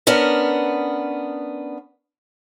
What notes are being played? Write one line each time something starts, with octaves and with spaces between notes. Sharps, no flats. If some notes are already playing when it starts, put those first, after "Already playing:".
B3 C#4 D4 A#4